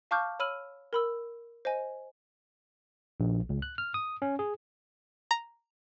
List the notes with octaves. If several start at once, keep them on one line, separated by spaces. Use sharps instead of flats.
F5 A5 C#6 D6 F6 G6
C#5 B5 E6 F6 D#7 F#7
A#4 B5 E6
C5 D#5 G#5
A#1
C#2
F#6
F6
D#6
C#4
G#4
A#5